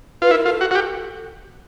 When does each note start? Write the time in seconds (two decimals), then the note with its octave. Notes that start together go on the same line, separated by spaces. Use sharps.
0.22 F4 B4
0.31 E4 A#4
0.45 F4 A4
0.61 F#4
0.71 F#4
0.75 G4